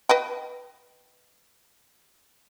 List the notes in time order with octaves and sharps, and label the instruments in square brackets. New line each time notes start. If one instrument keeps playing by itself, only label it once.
[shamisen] B4 D#5 G5